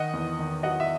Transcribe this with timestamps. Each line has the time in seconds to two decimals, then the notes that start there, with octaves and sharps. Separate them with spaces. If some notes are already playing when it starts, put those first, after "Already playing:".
Already playing: D#3 D#5 F#5
0.13 E2
0.39 D#3
0.63 F#3 D#5 F#5
0.80 E5